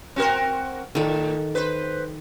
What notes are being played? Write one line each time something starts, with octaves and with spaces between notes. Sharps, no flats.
C4 F#4 A#4
A2 D#3 A4
B4 C5